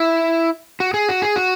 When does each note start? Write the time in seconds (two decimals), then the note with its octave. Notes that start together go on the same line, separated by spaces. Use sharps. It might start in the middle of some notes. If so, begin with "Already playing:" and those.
Already playing: E4
0.80 F#4
0.94 G#4
1.08 F#4
1.22 G#4
1.36 F#4